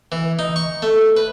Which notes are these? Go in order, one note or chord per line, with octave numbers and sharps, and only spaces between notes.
E3
D#4
C#6
A3
B4